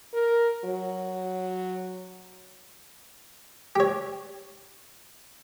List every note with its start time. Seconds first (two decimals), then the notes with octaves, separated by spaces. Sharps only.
0.13 A#4
0.65 F#3
3.76 G4 C#5